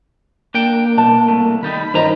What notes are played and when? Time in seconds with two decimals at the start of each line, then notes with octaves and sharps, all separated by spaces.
0.54 A#3 D4 G5
0.98 B2 D4 A5
1.28 C2 A3
1.63 D#3 G3 D#4 B5
1.94 G2 D#3 C#4 C5 D#5 A#5